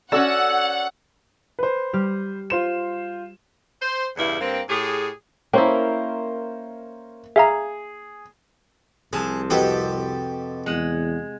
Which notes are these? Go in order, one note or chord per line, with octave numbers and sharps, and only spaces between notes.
C#4 F#4 A4 D5 F#5 E6
B4 C5
G3 G4 F6
F4 C5 E7
C5
E2 G2 C#3 E4
G2 A#3 C4
A2 G4 G#4
A#3 C#4 E4 A#4 C5 G5
G#4 E5 F5 A#5
C2 C3 F3 G#4 A5
F2 F#4 G4 A4 B4 D#5
E2 G#3 F#5